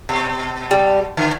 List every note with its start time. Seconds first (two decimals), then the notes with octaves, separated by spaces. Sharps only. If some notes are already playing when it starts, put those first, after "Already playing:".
0.09 B2
0.71 G3
1.17 D3